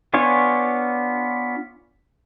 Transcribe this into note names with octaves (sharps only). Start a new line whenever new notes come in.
B3 D4 F4 C#5 G#5